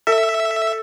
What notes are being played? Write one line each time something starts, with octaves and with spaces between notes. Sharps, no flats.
A4 E5